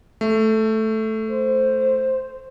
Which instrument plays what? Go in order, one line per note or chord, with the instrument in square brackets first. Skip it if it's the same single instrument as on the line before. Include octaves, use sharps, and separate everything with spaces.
[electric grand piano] A3
[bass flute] C5